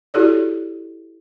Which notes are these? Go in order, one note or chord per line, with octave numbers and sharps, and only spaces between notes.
E4 F#4 G4 A4 C#5 D5